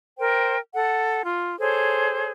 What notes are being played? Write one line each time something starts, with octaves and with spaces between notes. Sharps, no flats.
A#4 C5 G5
A4 F#5
F4
G#4 A4 C5 C#5